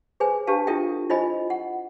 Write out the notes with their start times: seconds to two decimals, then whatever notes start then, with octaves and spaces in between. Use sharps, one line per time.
0.20 G#4 B4 C5 G#5
0.47 D4 G4 B4 F5 A5
0.67 D4 E4 F4 A4 E5 G5
1.10 E4 F4 C5 D#5 G#5 B5
1.50 F#5